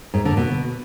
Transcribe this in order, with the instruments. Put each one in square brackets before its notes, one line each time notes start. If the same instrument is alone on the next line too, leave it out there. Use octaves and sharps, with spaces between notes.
[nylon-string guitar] G#2
D3
B2